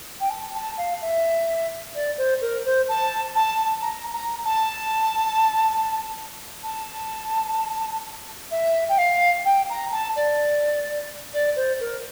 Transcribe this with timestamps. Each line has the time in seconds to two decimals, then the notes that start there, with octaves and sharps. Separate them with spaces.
0.20 G5
0.30 A5
0.54 A5
0.78 F5
1.01 E5
1.95 D5
2.18 C5
2.41 A#4
2.65 C5
2.88 A5
3.36 A5
3.82 A#5
4.13 A#5
4.45 A5
6.63 A5
8.51 E5
8.89 G5
8.98 F5
9.45 G5
9.69 A#5
9.92 A5
10.16 D5
11.34 D5
11.56 C5
11.80 A#4